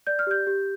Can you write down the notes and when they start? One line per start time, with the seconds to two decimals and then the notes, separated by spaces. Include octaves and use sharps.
0.07 D5 G6
0.19 F6
0.27 G4 G6
0.47 G4